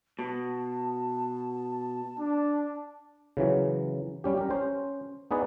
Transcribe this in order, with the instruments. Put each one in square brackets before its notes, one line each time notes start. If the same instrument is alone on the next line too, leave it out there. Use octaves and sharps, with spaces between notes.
[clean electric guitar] B2 [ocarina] A5
[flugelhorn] D4
[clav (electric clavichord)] C#3 E3 F#3
G3 C#4 G4
G4 A#4
C#4 C5
B3 D#4 G#4 B4 D5